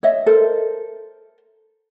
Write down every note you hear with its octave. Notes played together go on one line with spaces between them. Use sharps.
C#5 D#5 E5
A4 A#4 C5